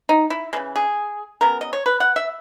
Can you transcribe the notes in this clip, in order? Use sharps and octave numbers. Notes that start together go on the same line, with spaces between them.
D#4
E4
C#3 E3 G#3
G#4
C#3 F#3 B3 A#4
D#5
C#5
B4
F#5
E5